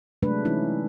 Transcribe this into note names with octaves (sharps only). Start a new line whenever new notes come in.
C3 F#3 G#3 A3 D4 B4
E3 C#4 D#4 E4